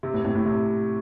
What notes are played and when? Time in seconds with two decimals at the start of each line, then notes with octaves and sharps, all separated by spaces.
0.03 C3
0.14 A2
0.24 A2
0.35 A2
0.46 C3